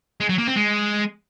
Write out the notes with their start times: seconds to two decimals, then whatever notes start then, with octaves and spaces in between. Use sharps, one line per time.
0.20 G#3
0.29 F#3
0.38 A#3
0.47 C4
0.56 G#3